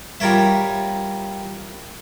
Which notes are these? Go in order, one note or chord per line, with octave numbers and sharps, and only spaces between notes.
G3 F4 A#4 C#5 E5